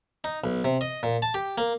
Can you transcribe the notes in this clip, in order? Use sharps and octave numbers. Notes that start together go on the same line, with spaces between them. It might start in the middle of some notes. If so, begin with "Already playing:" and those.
D#4
B1
C3
D#5
A#2
A5
G4
A#3